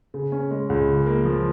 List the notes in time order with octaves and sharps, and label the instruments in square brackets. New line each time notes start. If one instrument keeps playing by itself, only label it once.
[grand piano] C#3
C#4
G#3
C#2
C#3
A#3
F3